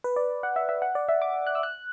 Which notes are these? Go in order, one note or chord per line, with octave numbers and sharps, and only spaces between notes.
B4
D5
F#5
E5
E5
F#5
D5
E5
D6
F#6
E6
F#6